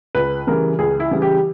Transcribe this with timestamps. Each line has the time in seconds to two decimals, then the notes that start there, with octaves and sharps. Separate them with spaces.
0.15 C#2 B4
0.47 C#3 E3 G3 A#4
0.79 C#2 G#4
1.00 E4
1.11 C#3 E3 G3
1.22 G4